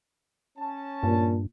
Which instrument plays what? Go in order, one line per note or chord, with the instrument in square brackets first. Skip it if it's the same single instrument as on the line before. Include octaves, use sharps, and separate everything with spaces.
[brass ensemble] C#4 A5
[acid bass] G2 [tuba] A#2